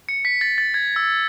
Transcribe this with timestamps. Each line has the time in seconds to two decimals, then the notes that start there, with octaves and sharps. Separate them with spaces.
0.09 C#7
0.25 B6
0.41 A6
0.58 A6
0.74 G#6
0.96 E6